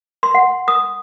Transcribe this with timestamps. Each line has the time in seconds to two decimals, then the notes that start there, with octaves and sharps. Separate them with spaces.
0.23 C6
0.35 F#5
0.68 D#6